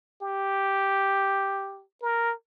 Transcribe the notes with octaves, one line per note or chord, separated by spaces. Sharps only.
G4
A#4